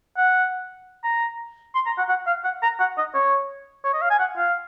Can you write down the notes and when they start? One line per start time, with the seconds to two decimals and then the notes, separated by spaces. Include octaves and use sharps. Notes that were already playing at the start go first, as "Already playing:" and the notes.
0.17 F#5
1.04 A#5
1.75 C6
1.86 A#5
1.98 F#5
2.09 F#5
2.27 F5
2.44 F#5
2.62 A#5
2.79 F#5
2.97 D#5
3.14 C#5
3.84 C#5
3.93 D#5
4.01 F5
4.10 G#5
4.19 F#5
4.37 F5